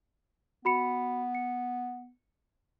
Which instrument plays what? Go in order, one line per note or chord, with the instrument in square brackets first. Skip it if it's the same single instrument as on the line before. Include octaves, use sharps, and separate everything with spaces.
[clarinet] B3 [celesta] F#4 B5 C#7
[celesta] C#7